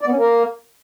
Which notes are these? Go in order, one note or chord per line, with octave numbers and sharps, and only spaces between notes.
D5
B3
C#4
A#3